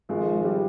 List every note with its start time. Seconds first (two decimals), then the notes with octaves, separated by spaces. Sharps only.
0.09 G#1 F3 G#3
0.44 G3